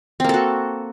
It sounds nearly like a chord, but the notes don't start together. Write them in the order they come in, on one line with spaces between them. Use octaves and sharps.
C4 A#3 A4 F#4